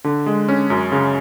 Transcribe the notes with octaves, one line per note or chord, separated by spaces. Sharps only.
D3
G#3
C#4
F#2
C#3